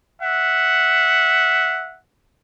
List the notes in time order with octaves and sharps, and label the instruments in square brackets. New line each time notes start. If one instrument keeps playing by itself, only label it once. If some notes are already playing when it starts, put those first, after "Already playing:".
[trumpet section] E5 F#5